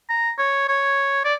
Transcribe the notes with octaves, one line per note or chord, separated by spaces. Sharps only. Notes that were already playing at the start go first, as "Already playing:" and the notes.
A#5
C#5
C#5
D5